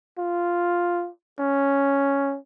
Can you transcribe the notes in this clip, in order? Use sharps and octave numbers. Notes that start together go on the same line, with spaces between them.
F4
C#4